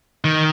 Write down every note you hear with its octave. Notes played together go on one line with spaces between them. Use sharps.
D#3